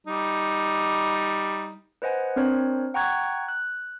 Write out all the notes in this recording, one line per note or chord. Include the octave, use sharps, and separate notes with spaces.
G3 D#4
B4 C5 D#5 F#5 G#5
C4 D4 A#4 C5 C#5
F#5 G5 A#5 C#6 F#6 G#6
F#6